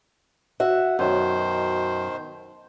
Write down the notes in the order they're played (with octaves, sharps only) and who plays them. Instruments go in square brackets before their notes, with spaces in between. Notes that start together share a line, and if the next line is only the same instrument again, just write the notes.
[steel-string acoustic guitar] F#4 E5 F#5
[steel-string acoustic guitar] F#2 [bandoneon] B2 D#3 C5